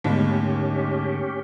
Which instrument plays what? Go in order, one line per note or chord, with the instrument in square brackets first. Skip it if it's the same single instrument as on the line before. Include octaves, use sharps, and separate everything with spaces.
[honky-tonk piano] D#2 G#3 [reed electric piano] G#2 D3 [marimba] A3 B3 [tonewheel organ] C#4 G4